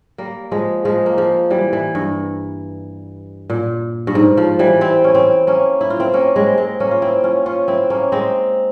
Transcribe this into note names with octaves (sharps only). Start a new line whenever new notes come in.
G3 A#3
F3 G#3
F3 G#3
A#3
F3 G#3
E3 G3
E3
G2
A#2
G2
G#2
F3
E3 G3
C4 E4
C#4
C4 E4
A#3 C#4
E4
F4
C4 E4
A#3 C#4
G#3 C4
G#3 C4
A#3 C#4
F4
C4 E4
C#4 F4
C#4 F4
C4 E4
A#3 C#4
G#3 C4